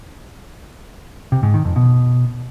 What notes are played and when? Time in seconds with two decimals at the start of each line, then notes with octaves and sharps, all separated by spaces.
1.32 C3
1.43 G#2
1.54 D#3
1.65 F2
1.76 B2